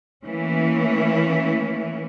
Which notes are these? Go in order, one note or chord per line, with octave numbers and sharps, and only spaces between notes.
E3 A3 A#3 C#4 E4